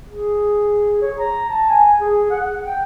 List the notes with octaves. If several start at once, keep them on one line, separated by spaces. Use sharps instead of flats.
G#4
C#5
A#5
A5
G#5
G#4
F#5
G5